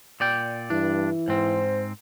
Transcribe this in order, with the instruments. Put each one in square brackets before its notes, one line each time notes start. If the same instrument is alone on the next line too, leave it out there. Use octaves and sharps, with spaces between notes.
[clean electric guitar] A#2 D5 G5
[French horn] G2 [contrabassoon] E3 [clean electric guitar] D4
[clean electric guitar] G#2 C4 [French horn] C5